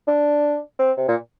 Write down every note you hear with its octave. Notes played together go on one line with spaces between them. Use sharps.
D4
C4
C3
A#2